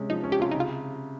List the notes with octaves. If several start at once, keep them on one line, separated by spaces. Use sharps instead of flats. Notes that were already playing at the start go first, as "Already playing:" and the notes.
Already playing: C3 G#3 C#4
F3 D#4
C#4
G4
C3 F4
C#3 D#4
F4